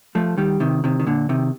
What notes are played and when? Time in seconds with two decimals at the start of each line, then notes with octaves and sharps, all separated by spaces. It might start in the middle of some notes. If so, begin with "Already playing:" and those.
0.15 F3 A3
0.38 D#3 G3
0.60 C3 D#3
0.84 C3 D#3
1.00 D#3
1.07 A#2 D3
1.29 C3 D#3